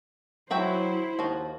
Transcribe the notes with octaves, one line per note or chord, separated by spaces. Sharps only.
F#3 E4 F#4 C5 E5 G5
D#2 F3 F#4